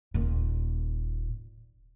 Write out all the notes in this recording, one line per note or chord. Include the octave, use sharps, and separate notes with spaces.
D#1 A#2